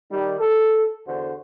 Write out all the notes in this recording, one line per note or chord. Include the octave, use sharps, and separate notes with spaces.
D#3 G3
A4
E2 D3 F#4 C5